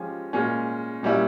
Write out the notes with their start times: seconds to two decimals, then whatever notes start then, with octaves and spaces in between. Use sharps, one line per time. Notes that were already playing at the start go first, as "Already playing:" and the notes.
Already playing: F3 G#3 C#4 G4
0.33 A#2 G#3 C#4
1.03 A#2 G3 C#4 E4